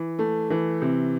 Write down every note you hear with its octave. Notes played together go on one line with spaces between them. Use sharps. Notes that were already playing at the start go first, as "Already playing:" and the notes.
Already playing: E3
A3
E3
C3